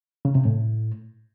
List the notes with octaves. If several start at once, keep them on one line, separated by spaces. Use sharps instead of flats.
C#3
C3
A2